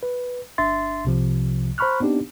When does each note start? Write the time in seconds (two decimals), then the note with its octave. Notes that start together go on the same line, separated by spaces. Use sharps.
0.03 B4
0.58 G1 D4 E5 C6 A6
1.05 C2 C3 F3
1.78 C5 A#5 B5 C#6 F6 F#6
2.00 B3 C4 D4 D#4 G4